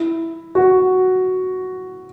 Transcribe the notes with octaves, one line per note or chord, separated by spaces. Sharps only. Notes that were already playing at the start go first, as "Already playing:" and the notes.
Already playing: E4
F#4